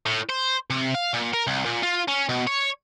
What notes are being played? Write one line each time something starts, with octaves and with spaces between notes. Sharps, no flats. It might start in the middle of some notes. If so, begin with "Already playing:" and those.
A2
C5
C3
F5
A#2
A#4
C2
A#2
F4
C#4
B2
C#5